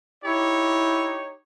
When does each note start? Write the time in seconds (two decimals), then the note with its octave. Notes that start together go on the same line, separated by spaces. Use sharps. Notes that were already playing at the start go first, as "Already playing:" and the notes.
0.24 D#4 E4 G4 C#5